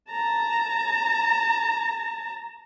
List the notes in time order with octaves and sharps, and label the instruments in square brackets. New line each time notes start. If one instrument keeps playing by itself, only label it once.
[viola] A5 A#5